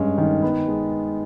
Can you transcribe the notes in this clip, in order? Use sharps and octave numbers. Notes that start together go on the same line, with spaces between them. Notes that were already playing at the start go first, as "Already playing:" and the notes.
Already playing: G2 G#3 C#4
D#3
B3
G#3